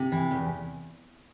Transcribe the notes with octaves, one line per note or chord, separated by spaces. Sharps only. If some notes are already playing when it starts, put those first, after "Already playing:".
Already playing: C3
E3
E2